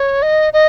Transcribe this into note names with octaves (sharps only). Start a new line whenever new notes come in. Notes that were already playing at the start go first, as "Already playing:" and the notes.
Already playing: C#5
D#5
D#5